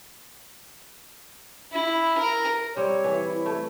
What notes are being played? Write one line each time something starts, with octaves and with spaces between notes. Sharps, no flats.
E4
A#4
G3 C4 C#5
E3
E4
A3